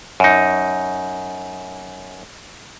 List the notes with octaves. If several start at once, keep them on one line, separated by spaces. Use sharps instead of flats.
F#2 D#4